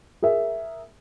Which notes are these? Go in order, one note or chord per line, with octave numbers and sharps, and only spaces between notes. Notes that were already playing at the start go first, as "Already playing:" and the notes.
G#4 A#4 E5